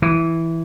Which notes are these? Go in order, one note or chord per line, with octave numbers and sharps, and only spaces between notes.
E3